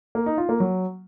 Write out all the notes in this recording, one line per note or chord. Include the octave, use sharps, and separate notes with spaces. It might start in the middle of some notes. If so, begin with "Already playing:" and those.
A#3
D#4
F4
A#3
F#3